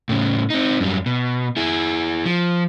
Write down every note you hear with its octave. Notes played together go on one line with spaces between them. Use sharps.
A2 C#3
C4 D#4
F#2 G3
B2
E4 G#4
F3